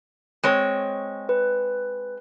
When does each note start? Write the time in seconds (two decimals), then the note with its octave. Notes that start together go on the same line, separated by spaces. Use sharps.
0.43 G#3 C4 C#5
1.29 B4